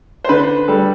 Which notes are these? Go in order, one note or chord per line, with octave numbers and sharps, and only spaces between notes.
C5
D3 B4
G3 A4